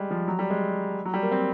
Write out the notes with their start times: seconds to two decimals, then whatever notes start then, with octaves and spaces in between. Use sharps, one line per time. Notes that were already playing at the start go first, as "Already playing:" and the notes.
Already playing: G3 G#3
0.11 F3
0.28 F#3
0.39 G3
0.50 G#3
1.05 F#3
1.14 G3
1.22 A#3
1.32 C4